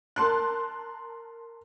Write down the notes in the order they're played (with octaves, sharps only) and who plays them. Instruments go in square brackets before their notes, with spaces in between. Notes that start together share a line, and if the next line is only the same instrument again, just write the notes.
[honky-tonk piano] A#4 A5 C6 F#6